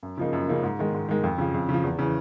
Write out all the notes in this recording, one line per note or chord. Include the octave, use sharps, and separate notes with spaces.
F#2
C#3 F3 A#3 D#4
F#2
C#3 F3 A#3 D#4
G#2
D#3 G#3
G#2
D#3 G#3
F2
C#3 F3
F2
C#3
F3
E2
C#3 E3